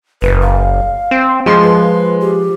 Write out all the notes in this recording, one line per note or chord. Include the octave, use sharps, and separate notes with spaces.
F#1 B4
F5
C4
F3 G#3 C6
B4
G4